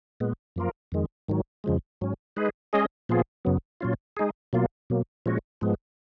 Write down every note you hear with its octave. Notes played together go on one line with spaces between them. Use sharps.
A#2 G#3 B3
F#2 F3 A#3 F4 A#4
F2 D#3 G#3
G#2 D#3 F#3
F2 C#3 F3 G#3
G#2 F#3 C#4
G#3 D#4 G#4 B4
G#3 C#4 G#4 D#5
A#2 F3 B3 F4 G#4
F#2 C#3 F#3 B3
A#2 F#3 C#4 F4
G#3 D#4 G#4
B2 F#3 A#3 F4
B2 F#3 A#3
A#2 F3 G#3 C#4 F#4
G#2 F3 G#3 B3